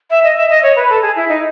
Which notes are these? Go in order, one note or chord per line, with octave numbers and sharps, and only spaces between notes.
E5
D#5
E5
D#5
C#5
B4
A4
G#4
E4
D#4